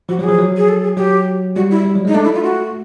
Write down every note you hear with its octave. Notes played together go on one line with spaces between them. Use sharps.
F3 F#4
F3 F#3 G4 G#4
F#3
G#4
A4
G#4
F#3 G4
G3 F#4
E4
G3
F#3
G#3 D#4
A3 D4
E4
F4
F#4